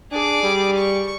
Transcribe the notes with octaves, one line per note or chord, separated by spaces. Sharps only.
D4 G#4 D6
G3
C#6